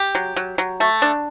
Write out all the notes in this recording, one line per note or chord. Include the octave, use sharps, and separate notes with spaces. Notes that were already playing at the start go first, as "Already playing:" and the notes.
Already playing: G4
F#3
F#3
F#3
A3
D4